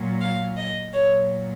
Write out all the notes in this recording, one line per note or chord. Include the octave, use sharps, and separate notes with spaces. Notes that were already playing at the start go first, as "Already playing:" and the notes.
Already playing: A#2 F#3
F5
D#5
A#2 F#3 C#5